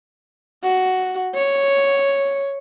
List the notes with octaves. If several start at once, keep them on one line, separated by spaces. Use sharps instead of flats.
F#4
C#5